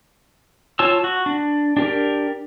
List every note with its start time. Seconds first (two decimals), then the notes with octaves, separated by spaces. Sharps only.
0.79 F4 C#5 A5 E6
1.04 F#4
1.26 D4
1.77 D4 G4 A#4